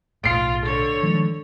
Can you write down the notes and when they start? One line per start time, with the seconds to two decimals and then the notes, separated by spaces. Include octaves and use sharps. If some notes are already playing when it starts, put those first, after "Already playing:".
0.24 B1 A2 F4 C7 D7
0.64 D3 C#5
1.03 D#3 F3 G#3